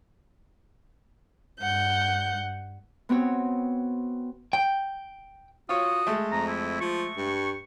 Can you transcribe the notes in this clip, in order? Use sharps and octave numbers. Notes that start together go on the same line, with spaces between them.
G2 F#5 G6
B3 C4 F#4 C#5
G5
F4 F#4 C#5 D#6
G#3 A3
F2 A#5
E4
F3 C#6
G2